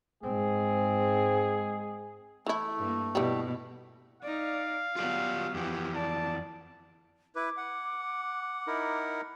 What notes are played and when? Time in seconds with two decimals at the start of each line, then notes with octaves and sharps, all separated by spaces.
0.23 G#2 G#3 C4 G#4
2.47 E3 A3 E4
2.79 G2 A#3
3.15 B2 E3 G3
4.23 D#4 D5 F5
4.96 F#3 B3 F4 G4 D5
5.54 F2 E3 G4
5.95 D5 A5
7.36 E4 B4 D6
7.57 F#5
8.67 D#4 E4 A#4